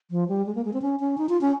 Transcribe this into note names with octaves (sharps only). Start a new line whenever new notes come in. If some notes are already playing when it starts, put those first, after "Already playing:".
F3
G3
G#3
A#3
G#3
C4
C#4
C#4
D#4
F4
C#4